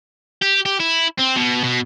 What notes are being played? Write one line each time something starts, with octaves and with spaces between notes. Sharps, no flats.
G4
G4
E4
C4
B2
B2